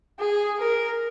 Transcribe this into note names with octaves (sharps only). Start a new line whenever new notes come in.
G#4
A#4